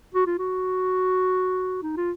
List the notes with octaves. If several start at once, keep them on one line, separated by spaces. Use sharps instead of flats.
F#4
F4
F#4
D#4
F4